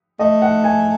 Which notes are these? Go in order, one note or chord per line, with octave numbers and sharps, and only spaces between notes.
A3 D#5
F#5
G#5